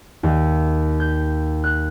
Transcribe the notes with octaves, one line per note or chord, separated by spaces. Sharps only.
D#2
G6
F#6